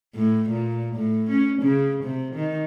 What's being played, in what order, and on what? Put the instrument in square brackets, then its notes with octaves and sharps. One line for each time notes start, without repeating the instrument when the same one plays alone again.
[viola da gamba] A2
A#2
A2
C#4
C#3
C3
D#3